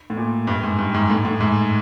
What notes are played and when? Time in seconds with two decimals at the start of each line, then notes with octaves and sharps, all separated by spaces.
0.10 A2
0.17 A#2
0.47 G2
0.63 G#2
0.79 G2
0.94 G#2
1.10 A2
1.25 A2
1.41 G#2